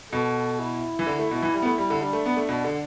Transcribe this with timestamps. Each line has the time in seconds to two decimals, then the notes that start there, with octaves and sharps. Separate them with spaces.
0.12 B2 A4
0.59 E4
0.99 E3
1.06 D3
1.19 A3
1.31 B2
1.42 E3
1.54 G3
1.62 B3
1.66 A3
1.78 G3
1.90 D3
2.01 G3 D4
2.13 A3
2.26 B3
2.37 A3
2.49 B2
2.64 D3